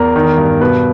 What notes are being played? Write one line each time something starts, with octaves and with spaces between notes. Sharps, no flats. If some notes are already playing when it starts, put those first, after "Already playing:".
Already playing: E2 A#4
D#3
G2
B2 B4